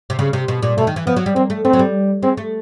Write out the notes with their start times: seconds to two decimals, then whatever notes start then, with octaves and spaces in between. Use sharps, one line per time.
0.10 C3
0.19 C#3
0.33 C3
0.48 B2
0.62 A#2
0.78 B2 A3
0.87 D#3
0.96 E3
1.07 F3 B3
1.16 F#3
1.26 G3
1.35 A#3 C4
1.50 A3
1.65 A3 C4
1.73 F#3
1.79 G3
2.23 G#3 C4
2.37 A3